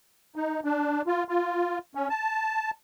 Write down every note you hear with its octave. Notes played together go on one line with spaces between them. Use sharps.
D#4
D4
F4
F4
C#4
A5